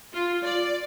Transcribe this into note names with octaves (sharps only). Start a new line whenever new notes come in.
F4
D5